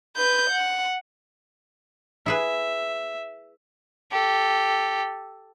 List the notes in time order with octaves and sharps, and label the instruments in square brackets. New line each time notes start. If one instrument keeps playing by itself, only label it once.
[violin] B4 G6
F#5
[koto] E4 G#4 B4 [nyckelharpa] E5
[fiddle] G4 A4